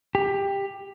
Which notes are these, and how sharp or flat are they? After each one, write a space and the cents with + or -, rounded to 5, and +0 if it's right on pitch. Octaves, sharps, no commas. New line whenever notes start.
G4 +15